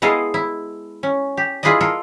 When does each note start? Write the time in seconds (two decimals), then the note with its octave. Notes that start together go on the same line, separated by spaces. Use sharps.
0.02 G#3 B3 E4 A4 D#5 F5
0.34 E4
1.03 C#4
1.37 G4
1.63 E4 F4 G#4 B4 D5 D#5
1.81 F4 A4 A#4